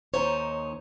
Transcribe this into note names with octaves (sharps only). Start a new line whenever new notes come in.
D#2 D#4 C5 C#5